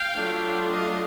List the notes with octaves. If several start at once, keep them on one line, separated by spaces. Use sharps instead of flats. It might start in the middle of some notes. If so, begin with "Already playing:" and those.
Already playing: F5 G5
F#3 A3 D4 F4
D#5 F5